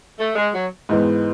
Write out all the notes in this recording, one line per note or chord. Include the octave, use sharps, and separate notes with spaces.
A3
G#3
F#3
G#2 E3 G#3 B3